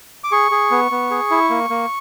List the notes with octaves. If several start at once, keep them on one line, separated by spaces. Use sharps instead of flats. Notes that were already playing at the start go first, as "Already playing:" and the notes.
D6
G#4 C#6
G#4
B3
B3
G#4
E4
A#3
A#3